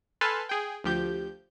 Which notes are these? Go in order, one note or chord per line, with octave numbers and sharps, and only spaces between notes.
A4 B4 G#5 A5 C6 F6
G#4 G5
D2 F3 G4 G6